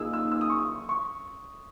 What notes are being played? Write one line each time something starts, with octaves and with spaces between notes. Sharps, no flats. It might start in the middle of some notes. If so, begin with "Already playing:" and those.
Already playing: A#2 A#3 D#4 G#4 E6
E6
E6
D#6
C#6
D#6
C#6